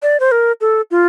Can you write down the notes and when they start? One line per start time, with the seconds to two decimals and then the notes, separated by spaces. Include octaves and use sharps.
0.02 D5
0.20 C5
0.32 A#4
0.61 A4
0.91 F4